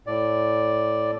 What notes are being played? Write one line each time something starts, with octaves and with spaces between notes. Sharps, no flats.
A2 D5